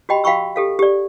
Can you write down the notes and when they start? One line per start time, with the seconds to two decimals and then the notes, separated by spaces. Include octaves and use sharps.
0.09 F#4 G4 D#5 G5 B5
0.24 F#4 F5 G5 B5 C#6 E6
0.56 G4 A4 F5
0.79 G4 D5